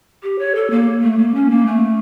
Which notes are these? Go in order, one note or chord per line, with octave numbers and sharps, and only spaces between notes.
G4
C#5
A4
A#3
A3
A#3
C#4
A#3
A3